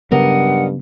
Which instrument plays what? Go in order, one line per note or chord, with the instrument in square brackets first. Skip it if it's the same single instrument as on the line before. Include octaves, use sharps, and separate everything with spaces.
[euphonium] G2 [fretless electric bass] C#3 F#3 B3 [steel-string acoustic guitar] A#4 D5 D#5 [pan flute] F#5